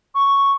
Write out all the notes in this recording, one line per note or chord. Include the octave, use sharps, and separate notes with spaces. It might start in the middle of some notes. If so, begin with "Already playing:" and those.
C#6